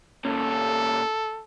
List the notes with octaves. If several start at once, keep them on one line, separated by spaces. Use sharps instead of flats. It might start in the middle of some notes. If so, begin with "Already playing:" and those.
A#2 C#4 A4